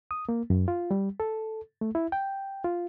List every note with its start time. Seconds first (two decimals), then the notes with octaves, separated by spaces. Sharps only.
0.11 D#6
0.29 A#3
0.50 F#2
0.68 F4
0.91 G3
1.20 A4
1.81 A3
1.95 E4
2.12 G5
2.65 F4